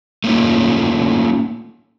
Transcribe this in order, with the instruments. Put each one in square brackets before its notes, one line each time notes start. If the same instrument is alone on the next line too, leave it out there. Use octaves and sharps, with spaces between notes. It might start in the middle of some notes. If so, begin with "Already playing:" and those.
[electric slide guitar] A3 A#3 C#4 D#4 F4